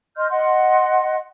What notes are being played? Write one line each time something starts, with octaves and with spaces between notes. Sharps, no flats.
D#5 C6 F6 G6
D#5 F#5 C6